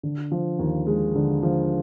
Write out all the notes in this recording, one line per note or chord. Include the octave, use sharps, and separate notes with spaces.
D3
F3
D#2
G#3
D3
F3